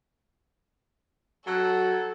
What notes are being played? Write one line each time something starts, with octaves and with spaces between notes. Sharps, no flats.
F#3 A4 F#5 E6 F#6